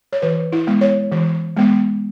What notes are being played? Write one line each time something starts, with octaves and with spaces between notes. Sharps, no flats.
C#5
E3 B4
E4
G#3 B3
C#5
E3
G#3 B3